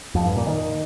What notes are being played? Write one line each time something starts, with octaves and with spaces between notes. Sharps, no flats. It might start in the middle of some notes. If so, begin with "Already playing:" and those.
F2
G2
A#2
D#3